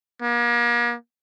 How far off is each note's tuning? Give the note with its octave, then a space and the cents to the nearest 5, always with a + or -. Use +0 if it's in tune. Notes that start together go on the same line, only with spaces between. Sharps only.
A#3 +40